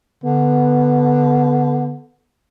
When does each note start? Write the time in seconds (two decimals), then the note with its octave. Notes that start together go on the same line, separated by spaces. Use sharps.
0.24 D3 B3